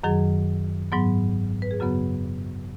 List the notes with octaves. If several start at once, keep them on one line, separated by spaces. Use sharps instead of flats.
F#2 D#3 F#3 G#4
G#2 F#3 B3
B4
G#4
F#2 C#3 F#3 B3 F#4